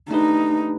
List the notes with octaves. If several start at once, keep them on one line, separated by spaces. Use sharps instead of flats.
A3 D4 D#4 G4 B4